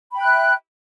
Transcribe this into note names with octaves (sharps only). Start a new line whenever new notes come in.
E5 G5 B5 F#6